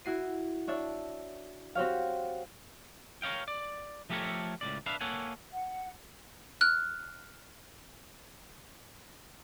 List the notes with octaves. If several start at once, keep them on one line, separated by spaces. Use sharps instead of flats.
E4 F#4 C7 D#7
D4 C#5 E5 A5
C4 F#4 G4 C#5 F5
A#4 C#5 D#5 F5 G5
D5
F3 A3 G4 A4 A#4 C#5
C#2 A2 C#3 D5
D4 B4 E5 F5
A#3 A4 C#5 F#5 G#5
F#5
F6 F#6